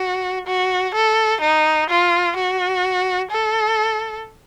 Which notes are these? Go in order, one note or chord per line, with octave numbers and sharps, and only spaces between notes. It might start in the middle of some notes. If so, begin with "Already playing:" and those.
Already playing: F#4
F#4
A4
D#4
F4
F#4
A4